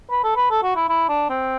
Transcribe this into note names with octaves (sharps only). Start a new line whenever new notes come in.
B4
A4
B4
A4
F#4
E4
E4
D4
C4